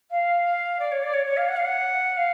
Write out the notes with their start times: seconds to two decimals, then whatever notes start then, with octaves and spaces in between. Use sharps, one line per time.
0.10 F5
0.79 D5
0.91 C#5
1.03 D5
1.13 C#5
1.25 C#5
1.36 F5
1.48 F#5
1.56 F5
1.64 F#5
2.17 F5